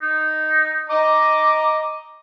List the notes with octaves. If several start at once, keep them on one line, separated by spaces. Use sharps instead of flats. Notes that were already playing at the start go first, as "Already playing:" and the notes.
D#4
D#5 A#5 D6